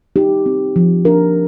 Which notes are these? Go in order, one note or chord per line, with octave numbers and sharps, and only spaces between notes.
D#4 G4
C4
F3
D4 A#4